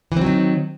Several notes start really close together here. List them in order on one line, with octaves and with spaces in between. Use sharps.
E3 C4 F#3 D#3